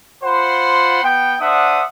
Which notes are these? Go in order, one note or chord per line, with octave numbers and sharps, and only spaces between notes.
F4 C5 F#5 B5 C6
B3 G5
D4 C5 E5 F#5 D#6